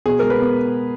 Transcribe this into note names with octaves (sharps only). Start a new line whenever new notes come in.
B2 G#4
G#3 A#4
B4
B3